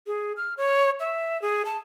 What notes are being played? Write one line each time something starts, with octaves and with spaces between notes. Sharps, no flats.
G#4
F6
C#5
E5
G#4
A5